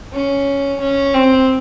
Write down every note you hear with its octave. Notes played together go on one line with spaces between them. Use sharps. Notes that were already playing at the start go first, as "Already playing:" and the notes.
C#4
C#4
C4